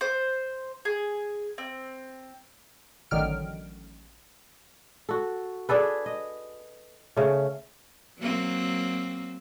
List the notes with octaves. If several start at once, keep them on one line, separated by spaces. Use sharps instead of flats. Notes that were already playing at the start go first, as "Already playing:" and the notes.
C5
G#4
C4
A1 D3 D#3 F#3 F6 D7
F#4 A4
D4 G#4 A4 B4
D#5
C#3 A3
F#3 A#3 C4